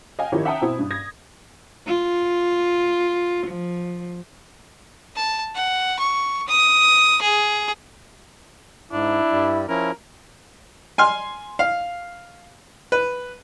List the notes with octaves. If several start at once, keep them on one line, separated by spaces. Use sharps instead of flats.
D#5 F5 G5 G#5
D#3 F3 D#4 E4 G4 C#5
E5 F#5 G5 A5 A#5 D#6
B2 C4 E4
G2
D#6 G#6 A#6
F4
F3
A5
F#5
C#6
D#6
G#4
G#2 D4 E4
G2 G3
F3 C#4 E4 A#4
G#5 C6 F6
F5
B4